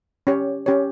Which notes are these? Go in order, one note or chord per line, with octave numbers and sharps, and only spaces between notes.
C#4 G4 C#5
C#4 G4 C#5